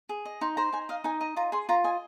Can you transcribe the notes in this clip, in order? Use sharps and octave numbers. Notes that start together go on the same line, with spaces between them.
G#4
D#5
D#4 C6
C5 A#5
D#4 G#5
D#5 F5
D#4 G#5
D#5 A#5
F4 A#5
G#4 C6
F4 A#5
D#5 G#5